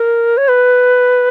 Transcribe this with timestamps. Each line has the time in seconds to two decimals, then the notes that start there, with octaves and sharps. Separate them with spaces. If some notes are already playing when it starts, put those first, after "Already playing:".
Already playing: A#4
0.37 C#5
0.48 B4